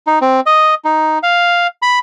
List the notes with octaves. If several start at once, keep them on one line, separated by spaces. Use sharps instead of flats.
D#4
C4
D#5
D#4
F5
B5